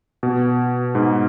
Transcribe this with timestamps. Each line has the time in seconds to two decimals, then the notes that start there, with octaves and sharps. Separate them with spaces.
0.23 B2
0.95 G#2